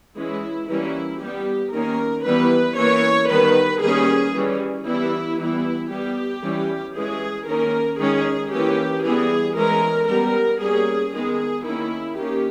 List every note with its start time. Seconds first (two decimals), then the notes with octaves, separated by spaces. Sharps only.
0.17 E3 G#3 C#4 E4
0.68 E3 G3 A#3 C#4 E4
1.21 G3 B3 G4
1.73 D#3 A#3 C#4 A#4
2.25 E3 G3 B3 B4
2.77 E3 A#3 C#4 C#5
3.29 D#3 G3 B3 B4
3.82 D#3 G3 A#3 C#4 G#4
4.35 E3 G3 C#4
4.86 E3 G3 B3 E4
5.38 E3 G3 B3 E4
5.90 G3 B3 G4
6.43 E3 G3 C#4
6.95 E3 G#3 C#4 G#4
7.47 D#3 A#3 C#4 A#4
8.00 D#3 G#3 C#4 G#4
8.52 E3 A#3 C#4 G4
9.03 E3 G3 B3 G#4
9.56 E3 G#3 C#4 A#4
10.08 G3 B3 A#4
10.61 G3 A#3 C#4 G#4
11.13 D#3 G#3 B3 G#4
11.64 D#3 A#3 C#4 E4
12.17 D#3 A#3 C#4 G4